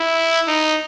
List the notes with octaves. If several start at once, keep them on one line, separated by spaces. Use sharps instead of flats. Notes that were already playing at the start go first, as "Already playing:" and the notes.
Already playing: E4
D#4